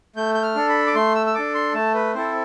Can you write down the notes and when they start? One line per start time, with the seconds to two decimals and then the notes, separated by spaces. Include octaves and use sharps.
0.16 A3 G6
0.34 G6
0.42 F6
0.55 D4 A4
0.69 B5
0.87 D6
0.95 A3 C6
1.15 E6
1.26 E6
1.35 D4 A4 D6
1.55 C6
1.74 A3 A5
1.94 B4
2.14 C4 E4 A4 C5